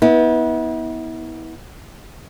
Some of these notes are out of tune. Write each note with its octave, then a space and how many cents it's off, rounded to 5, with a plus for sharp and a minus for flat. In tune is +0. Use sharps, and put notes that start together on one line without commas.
B3 -15 E4 -40